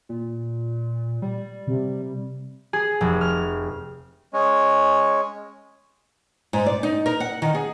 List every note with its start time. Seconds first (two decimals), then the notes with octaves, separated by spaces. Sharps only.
0.09 A#2
1.22 G3
1.67 C3
2.73 G#4
3.01 F1
3.21 F6
4.33 G#3 C#4
6.53 G#2
6.66 D5
6.83 D#4
7.06 A#4
7.20 F#5
7.42 D#3
7.55 G#4